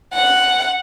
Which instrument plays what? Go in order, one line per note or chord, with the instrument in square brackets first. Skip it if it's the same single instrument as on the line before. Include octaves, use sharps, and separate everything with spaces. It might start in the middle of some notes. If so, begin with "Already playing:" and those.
[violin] F#5